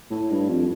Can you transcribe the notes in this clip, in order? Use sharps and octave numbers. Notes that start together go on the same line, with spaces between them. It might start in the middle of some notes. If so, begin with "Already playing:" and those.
A2
G2
F2